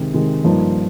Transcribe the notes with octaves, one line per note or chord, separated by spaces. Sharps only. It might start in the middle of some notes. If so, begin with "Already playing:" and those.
Already playing: C3 D#3 G#3
C3 D#3 G#3
G2 F3 A#3 D#4